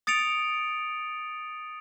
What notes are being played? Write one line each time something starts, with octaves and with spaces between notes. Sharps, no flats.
D#6 A6 C#7 D7 F7